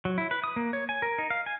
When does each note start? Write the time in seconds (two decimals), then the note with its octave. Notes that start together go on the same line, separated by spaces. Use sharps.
0.05 F#3
0.18 E4
0.31 B4
0.44 D#6
0.56 A#3
0.73 C#5
0.89 G#5
1.02 A#4
1.18 D#4
1.30 F5
1.46 G#5